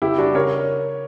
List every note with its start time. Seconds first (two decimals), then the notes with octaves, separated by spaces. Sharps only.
0.02 C#3 E4 G4
0.18 G3 D4 F#4
0.35 C#3 A#4 C#5